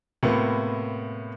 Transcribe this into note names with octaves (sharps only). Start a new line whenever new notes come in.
A2 C3 A#3 B3 F4